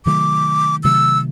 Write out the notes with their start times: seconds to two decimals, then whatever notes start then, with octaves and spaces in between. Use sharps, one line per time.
0.06 C3 D#3 F#3 A3 D6
0.84 C3 D#3 F#3 A3 E6